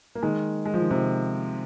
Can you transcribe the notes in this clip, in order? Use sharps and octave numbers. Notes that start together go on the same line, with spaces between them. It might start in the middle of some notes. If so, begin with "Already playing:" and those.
A#3
D#3 G#3
G#3
F3
D#3
C3 F3